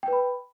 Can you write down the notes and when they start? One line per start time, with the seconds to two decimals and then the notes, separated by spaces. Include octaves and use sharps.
0.03 G5
0.08 B4
0.13 B5